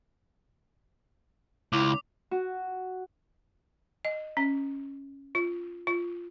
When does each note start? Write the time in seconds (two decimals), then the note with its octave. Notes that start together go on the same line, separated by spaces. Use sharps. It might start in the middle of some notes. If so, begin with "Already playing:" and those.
1.73 C#2 E4 D6
2.31 F#4
4.05 D#5
4.37 C#4
5.35 F4
5.87 F4